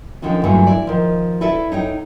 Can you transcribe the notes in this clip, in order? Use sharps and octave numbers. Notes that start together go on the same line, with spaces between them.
D3 D#3 F3 C#4
G2 A#2 D3 E3 F#3 A3
E4 D5
D#3 F3
E4 A4 B4 D5 E5
D#4 C#5 G5